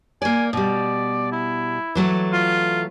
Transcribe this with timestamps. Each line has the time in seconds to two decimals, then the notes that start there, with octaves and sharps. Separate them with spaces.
0.22 A#3 D5 G#5
0.53 B2 G3 D5
1.32 E4
1.95 E3 F#3 A3
2.33 F4